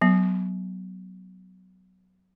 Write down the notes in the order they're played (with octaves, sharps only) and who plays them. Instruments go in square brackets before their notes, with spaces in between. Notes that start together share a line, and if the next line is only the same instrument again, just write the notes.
[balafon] F#3 B3